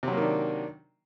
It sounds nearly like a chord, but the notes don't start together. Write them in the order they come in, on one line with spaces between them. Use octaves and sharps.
C3 F#3 A#3 D#3 D4